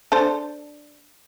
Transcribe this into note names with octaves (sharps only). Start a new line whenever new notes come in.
D4 A4 C5